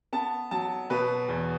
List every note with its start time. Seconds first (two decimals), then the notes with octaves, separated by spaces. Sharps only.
0.13 B3 A5
0.51 F#3 A5
0.90 B2 B4
1.29 E2